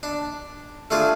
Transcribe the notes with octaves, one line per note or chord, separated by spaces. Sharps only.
D4
A3 D4 F4 G#4